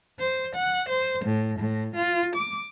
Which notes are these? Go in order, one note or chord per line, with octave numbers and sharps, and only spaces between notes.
C5
F#5
C5
A2
A2
F4
D6